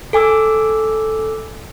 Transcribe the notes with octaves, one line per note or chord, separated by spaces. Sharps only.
A4 G#5 D6 E6